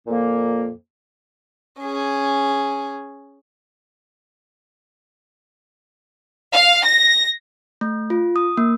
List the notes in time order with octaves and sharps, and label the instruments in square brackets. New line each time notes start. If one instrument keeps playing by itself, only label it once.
[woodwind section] F2 A#2 A#3
[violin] C#4 G#4
[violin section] F5
A#6
[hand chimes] A3
F4
D#6
A#3